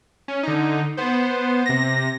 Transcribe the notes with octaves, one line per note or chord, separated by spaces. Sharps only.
C#4
D3 D#4
B3 C5
C3 A#6